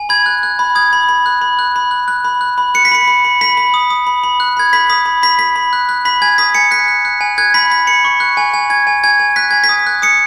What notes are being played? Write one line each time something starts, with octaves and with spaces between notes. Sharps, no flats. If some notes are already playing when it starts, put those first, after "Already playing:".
Already playing: G#5
B5 G#6
F#6
F#6
B5
D#6 G#6
B5
B5
F#6
B5
F#6
B5
F#6
F#6
B5
F#6
B5
F#6 C#7
B6
B5 C#7
B5
B5
B5 B6
B5
D#6
D#6
B5
B5
F#6
B5 G#6
B5 B6
D#6 B6
B5
B5 B6
B5 B6
B5
F#6
F#6
B5 B6
G#5 G#6
D#6 B6
G#5 C#7
F#6 B6
F#6
F#6
G#5
F#6 G#6
B5 B6
B5 B6
B5 C#7
C#6
F#6
G#5
G#5
G#5 G#6
G#5
G#5 G#6
G#5
F#6 B6
G#5 G#6
B6
D#6
F#6
D#6 C#7